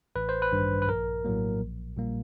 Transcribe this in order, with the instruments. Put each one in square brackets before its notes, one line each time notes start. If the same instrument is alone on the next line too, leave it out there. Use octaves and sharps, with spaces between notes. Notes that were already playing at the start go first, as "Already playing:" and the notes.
[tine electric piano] A1 B4
C5
B4
G2 D#3
B4
A#1 A#4
A2 F#3 A#3
A#1
A#2 G3 A#3